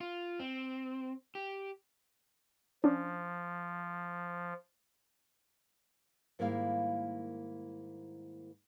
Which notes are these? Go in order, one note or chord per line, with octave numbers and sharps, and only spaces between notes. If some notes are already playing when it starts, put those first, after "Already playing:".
F4
C4
G4
F3 C#4 D4
G#2 D#3 G3 A#3 E4 F5